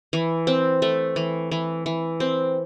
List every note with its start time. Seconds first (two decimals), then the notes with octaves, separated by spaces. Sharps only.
0.13 E3
0.47 C4
0.82 A3
1.16 E3
1.52 E3
1.86 E3
2.20 C4